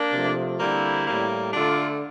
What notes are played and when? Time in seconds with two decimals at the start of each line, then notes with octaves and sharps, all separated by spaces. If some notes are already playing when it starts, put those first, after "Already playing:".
Already playing: A#3 D4
0.12 C3 F3 A3
0.59 D3 G3 A#3 C4 E4
1.07 A2 G3 A#3
1.53 D3 A3 D4 F4